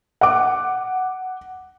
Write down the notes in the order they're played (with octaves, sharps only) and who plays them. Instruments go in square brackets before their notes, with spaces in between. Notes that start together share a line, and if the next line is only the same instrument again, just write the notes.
[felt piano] F#5 D6